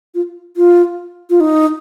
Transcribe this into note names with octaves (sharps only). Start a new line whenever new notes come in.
F4
F4
F4
D#4